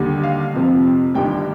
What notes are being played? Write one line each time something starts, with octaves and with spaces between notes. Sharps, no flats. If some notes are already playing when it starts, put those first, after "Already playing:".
Already playing: D#2 D3 G3
F5
F2 C3 F3
G1 G2 D#3 G3 G5